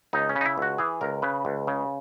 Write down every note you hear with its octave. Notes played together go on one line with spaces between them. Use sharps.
C#2 D#4
C#4
C#3
D#4
E4
C#2 F#4
E3 G#4
C#2 A#4
C#3 B4
C#2
C#3